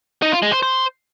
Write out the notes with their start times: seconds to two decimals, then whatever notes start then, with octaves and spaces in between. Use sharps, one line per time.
0.22 D#4
0.32 F4
0.42 G#3
0.52 C5
0.63 C5